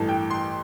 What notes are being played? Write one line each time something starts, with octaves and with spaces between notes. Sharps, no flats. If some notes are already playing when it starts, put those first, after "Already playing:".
Already playing: A1 G2 E3 A4
G5
C6